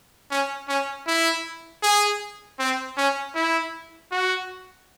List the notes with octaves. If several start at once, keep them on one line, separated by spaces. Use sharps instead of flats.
C#4
C#4
E4
G#4
C4
C#4
E4
F#4